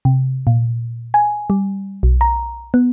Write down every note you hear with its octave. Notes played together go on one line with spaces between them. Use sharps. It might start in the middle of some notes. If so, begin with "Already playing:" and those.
C3
A#2
G#5
G3
B1
A#5
B3